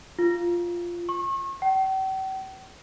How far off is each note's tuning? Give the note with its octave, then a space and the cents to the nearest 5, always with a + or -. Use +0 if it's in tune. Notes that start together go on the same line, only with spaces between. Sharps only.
F4 -5
C#6 -35
G5 -45